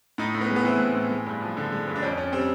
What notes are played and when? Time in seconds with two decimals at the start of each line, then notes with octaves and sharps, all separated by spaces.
0.18 A2 D#4
0.35 A2
0.41 B3
0.50 G#3
0.56 B3
0.64 E3 C4
0.80 A2
0.95 A2
1.11 G#3
1.26 G2
1.41 F3
1.57 D3
1.72 G#3
1.87 G2
1.96 D4
2.02 F2 C#4
2.17 F2 C#4
2.33 G3 C4